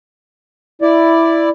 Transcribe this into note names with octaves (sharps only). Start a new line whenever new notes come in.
E4 D5